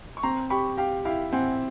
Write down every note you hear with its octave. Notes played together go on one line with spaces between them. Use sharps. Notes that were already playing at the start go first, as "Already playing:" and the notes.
C#6
C4 A#5 C6
G4 B5 C#6
G4 F5 G5
E4 F5 G5
C4 F#5 G#5